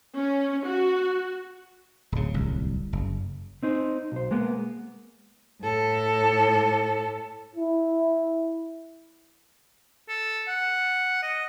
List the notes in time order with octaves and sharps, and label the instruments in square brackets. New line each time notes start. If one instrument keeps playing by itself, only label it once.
[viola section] C#4
F#4
[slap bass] D1 C#3
D1 C2
F#1
[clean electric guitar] C4 D#4 C5
B1 C5
G#3 A#3 B3
[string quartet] A2 A4
[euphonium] E4
[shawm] A4
F#5
D#5